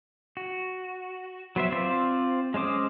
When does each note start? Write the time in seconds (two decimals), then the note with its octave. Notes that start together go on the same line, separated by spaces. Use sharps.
0.37 F#4
1.56 F#3 B3 C5 E5
1.72 C4 F4 C5 D5
2.54 G#3 C#4 C5 D6 D#6